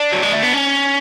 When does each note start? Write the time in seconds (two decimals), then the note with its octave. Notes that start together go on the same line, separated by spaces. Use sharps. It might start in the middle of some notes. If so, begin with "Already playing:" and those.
Already playing: D4
0.13 F#3
0.23 G#3
0.33 A3
0.44 B3
0.54 C#4